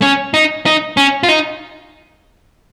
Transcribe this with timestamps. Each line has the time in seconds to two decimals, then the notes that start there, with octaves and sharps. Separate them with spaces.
0.02 C#4
0.34 D#4
0.66 D#4
0.97 C#4
1.23 F4
1.29 D#4